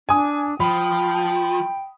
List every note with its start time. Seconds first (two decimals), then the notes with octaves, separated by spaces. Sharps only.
0.09 D4 G#5 D#6
0.60 F3 G5 B5